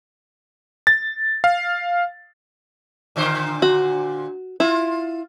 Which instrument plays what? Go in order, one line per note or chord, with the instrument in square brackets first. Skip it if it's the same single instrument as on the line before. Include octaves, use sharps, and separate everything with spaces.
[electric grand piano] A6
F5
[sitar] A#2 D3 C5
[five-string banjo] F#4
[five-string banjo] E4 [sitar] F4